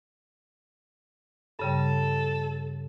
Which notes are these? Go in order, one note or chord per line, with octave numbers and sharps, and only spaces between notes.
G2 C#3 G3 A4